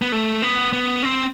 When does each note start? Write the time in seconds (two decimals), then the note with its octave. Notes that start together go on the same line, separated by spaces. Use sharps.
0.02 B3
0.12 A3
0.42 B3
0.73 B3
1.03 C4